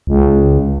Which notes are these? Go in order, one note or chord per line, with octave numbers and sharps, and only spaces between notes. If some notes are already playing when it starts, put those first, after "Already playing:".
C#2